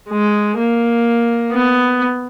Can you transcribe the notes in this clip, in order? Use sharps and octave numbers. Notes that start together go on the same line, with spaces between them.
G#3
A#3
B3